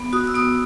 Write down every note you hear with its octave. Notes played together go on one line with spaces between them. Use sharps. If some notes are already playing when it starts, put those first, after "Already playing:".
Already playing: B3
F#4 D#6
E6
B3 D#6